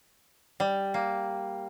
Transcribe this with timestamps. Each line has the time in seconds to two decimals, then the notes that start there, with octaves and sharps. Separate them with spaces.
0.60 G3
0.94 A#3